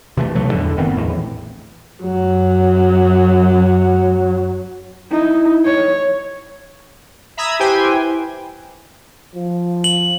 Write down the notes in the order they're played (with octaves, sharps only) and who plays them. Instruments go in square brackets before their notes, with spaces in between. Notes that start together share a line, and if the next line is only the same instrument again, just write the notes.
[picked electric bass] C3 E3 F3 A3
D2 B2 F#3 A3
E2 A2 D3
F#1 D#3 B3 C4
A#1 E2 A2
[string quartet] F#2 F#3
[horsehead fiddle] D#4 E4
C#5
[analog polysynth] E5 A#5 B5 D#6 E6 G#6
E4 G4 B4 C5 G5 G#5
[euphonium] F3
[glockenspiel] F#7